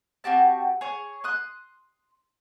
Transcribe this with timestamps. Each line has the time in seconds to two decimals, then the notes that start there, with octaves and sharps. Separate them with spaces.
0.24 C4 F#4 G4 A5
0.81 G#4 C#5 C#6
1.24 C6 D#6 F#6